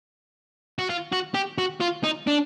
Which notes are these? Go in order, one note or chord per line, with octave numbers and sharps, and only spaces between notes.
F#4
F4
F#4
G4
F#4
F4
D#4
D4